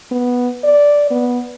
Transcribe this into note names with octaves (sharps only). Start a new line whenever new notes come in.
B3
D5
B3